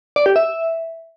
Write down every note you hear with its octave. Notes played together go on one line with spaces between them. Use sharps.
D5
G4
E5